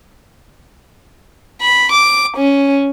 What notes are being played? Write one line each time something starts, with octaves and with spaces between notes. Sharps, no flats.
B5
D6
C#4